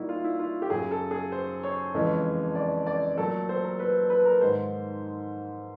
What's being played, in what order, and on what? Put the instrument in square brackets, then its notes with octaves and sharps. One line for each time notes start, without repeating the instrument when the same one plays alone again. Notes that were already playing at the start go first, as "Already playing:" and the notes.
Already playing: [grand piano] A#2 G3 D#4 E4 F#4
F4
E4
F4
G4
F#2 C#3 F#3 G#4
A4
G#4
C5
C#5
F2 C#3 E3 G#3
D5
D5
A#2 F#3 A3 A4
C5
A#4
B4
B4
A#4
G#2 D#3 G#3 C5